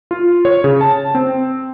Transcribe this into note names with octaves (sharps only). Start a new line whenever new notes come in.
F4
C#5
C#3
A5
C4